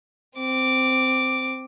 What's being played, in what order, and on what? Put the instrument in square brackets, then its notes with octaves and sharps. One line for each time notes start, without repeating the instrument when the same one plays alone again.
[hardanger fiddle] C4 D6